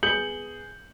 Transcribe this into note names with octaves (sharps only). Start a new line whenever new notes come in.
B3 G#4 G6 C#7 F#7